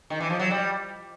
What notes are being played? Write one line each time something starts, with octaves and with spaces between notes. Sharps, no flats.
D#3
E3
F3
F#3
G3